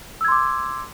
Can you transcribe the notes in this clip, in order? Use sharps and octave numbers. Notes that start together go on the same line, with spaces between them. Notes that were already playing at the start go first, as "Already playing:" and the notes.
C6 D6 E6 G#6